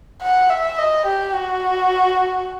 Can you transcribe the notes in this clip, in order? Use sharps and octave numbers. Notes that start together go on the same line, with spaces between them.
F#5
E5
D#5
G4
F#4